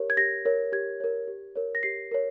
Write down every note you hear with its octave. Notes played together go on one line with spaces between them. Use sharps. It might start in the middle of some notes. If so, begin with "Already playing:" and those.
Already playing: G4 A#4 C#5
G#6
G4 A#6
A#4 C#5
G4 G#6
A#4 C#5
G4
A#4 C#5
A#6
G4 C7
A#4 C#5